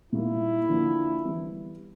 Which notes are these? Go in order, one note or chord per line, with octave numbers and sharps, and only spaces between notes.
A#2 G3 A#3 D#4 E4
D3 F3 A#3
E3 G3 B3